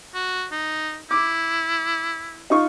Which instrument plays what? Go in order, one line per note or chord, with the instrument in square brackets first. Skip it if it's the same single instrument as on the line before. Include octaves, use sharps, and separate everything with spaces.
[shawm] F#4
D#4
[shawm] E4 [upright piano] D6
[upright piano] D#4 F4 C#6